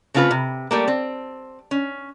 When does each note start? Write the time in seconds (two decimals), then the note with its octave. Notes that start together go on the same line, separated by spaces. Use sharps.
0.14 C#3 A3 C4 F4 G4 B4
0.31 C3
0.71 G3 A3 A#3
0.88 C4
1.71 C#4